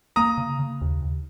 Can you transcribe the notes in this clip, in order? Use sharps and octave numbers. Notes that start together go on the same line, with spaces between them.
A#3 A#5 D#6
C#3
C#3
D#2
D#2